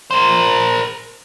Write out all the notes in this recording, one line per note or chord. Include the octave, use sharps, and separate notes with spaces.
A#4 C5